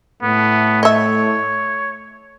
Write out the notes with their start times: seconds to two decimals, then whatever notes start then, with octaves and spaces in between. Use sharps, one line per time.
0.23 A2 A3 B3
0.83 C#5 D#5 E5